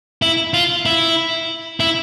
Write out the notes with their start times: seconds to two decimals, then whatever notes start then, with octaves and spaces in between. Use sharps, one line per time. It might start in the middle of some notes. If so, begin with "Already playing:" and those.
0.22 E4
0.54 F4
0.86 E4
1.80 E4